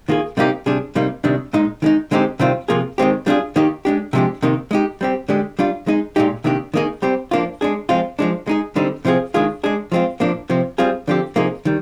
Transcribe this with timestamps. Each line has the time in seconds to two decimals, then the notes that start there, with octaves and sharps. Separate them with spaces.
0.09 D#3 A#3 F4 G#4
0.37 C3 G3 A#3 D#4 G4
0.66 C3 G3 D4 G#4
0.95 C3 G3 A#3 D#4
1.24 C3 D#3 G3 D4
1.53 A#2 G#3 D#4
1.82 D#3 G#3 D#4
2.11 D3 G#3 C4 D#4 G4
2.40 C3 D#3 G3 C4 F4
2.68 C3 F3 A#3 F4 G#4
2.98 D#3 G#3 C4 G4
3.27 G3 D4 F4 G#4
3.56 D#3 A#3 D#4 G4
3.85 G#3 D4 G4
4.13 C3 F3 G#3 D4 G4
4.42 C3 D#3 A#3 D#4
4.71 G#3 D#4 G4
5.01 G3 C4 G4
5.29 D3 G#3 D4 G4
5.59 G3 D4 F4
5.87 G#3 D#4 G#4
6.16 A#2 G#3 D#4 G4
6.44 C3 D#3 A#3 D4 G4
6.74 D#3 A#3 D#4 G#4
7.02 G3 C4 G4
7.31 F3 A#3 D4 F4
7.61 G#3 D4 G#4
7.89 F3 G#3 C4 F4
8.19 F3 G#3 D4
8.47 G#3 D#4 G#4
8.76 D3 G3 C4 D#4
9.05 C3 F3 C4 F4 G#4
9.34 D#3 G#3 D4 F4 G#4
9.64 G#3 D4 G#4
9.92 F3 G#3 C4 F4
10.20 A#2 F3 A#3 D4
10.50 C3 F3 C4
10.78 G3 C4 F4 G#4
11.08 D3 F3 C4 G4
11.36 C3 F3 A#3 D#4 G#4
11.65 D#3 G3